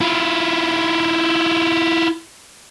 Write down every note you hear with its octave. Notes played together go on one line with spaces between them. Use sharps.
E4 F4